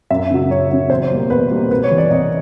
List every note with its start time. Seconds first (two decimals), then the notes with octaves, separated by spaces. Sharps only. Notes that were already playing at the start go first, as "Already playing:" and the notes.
0.10 F#2 E5
0.31 C#3 F#3
0.50 F#2 C#5
0.71 C#3 F#3
0.90 E2 C5
1.11 B2 G3 A#3
1.30 E2 B4
1.51 B2 G3 A#3
1.70 C2 B4
1.84 C#5
1.91 C3 E3
1.98 D5
2.11 C2 D#5